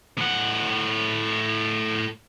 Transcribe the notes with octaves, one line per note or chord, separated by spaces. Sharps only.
A2 F#5